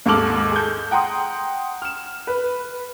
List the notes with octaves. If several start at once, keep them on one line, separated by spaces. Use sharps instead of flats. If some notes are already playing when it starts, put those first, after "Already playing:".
D#2 G#2 A4 D6 F6 F#7
G#4 A5 G6
F#5 G5 A#5 C6 D#6
F6 E7
B4